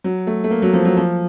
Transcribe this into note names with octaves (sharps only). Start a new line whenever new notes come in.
F#3
A3
A3
A#3
F#3
F3
F#3
F3